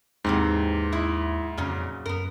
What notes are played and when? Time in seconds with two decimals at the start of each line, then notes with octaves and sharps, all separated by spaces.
0.24 D#2 G#2 C3 E3 C4
0.92 G#3 E4
1.57 F2 A#2 C#3 F#3
2.06 F#2 B3 A#4